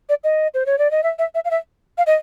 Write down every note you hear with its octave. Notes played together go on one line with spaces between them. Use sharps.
D5
D#5
C5
C#5
D5
D#5
E5
E5
E5
F5
E5
F5
D#5